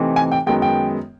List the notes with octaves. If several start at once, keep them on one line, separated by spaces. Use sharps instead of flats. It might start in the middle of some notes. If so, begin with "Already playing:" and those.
Already playing: C3 E3 A3 C4 D#4
G#5
G5
F#2 D#3 G#3 B3 G5
G5